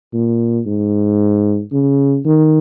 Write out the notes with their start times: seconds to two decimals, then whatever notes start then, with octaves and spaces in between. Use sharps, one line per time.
0.13 A#2
0.66 G#2
1.72 C#3
2.25 D#3